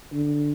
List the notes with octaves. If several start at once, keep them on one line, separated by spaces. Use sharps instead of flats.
D3